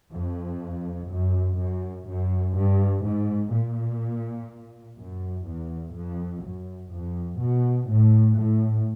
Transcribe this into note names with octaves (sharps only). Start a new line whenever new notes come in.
F2
F#2
F#2
F#2
G2
G#2
A#2
F#2
E2
F2
F#2
F2
B2
A2
A2